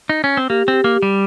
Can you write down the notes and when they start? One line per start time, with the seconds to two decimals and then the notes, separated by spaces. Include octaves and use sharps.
0.09 D#4
0.24 C#4
0.37 C4
0.50 A#3 G4
0.68 C4
0.73 G4
0.84 A#3
0.96 G4
1.03 G3